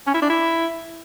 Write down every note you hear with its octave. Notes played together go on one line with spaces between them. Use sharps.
C#4
E4
D4
E4